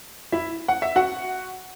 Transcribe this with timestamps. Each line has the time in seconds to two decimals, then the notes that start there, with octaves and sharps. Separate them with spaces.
0.32 E4 E5
0.68 F#5
0.82 E5
0.96 F#4 F#5